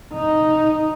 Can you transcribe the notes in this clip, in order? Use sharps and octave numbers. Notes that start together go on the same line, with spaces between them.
D#4